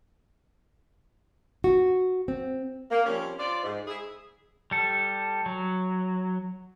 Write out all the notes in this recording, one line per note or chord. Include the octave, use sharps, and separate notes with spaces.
F#4
C4
A#3
F3 G3 C4 C#4
F4 C5 D5
G#2
E4 G#4
G3 A4
F#3